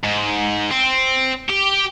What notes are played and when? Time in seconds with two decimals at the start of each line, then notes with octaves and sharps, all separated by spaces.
0.03 G#2
0.71 C4
1.49 G4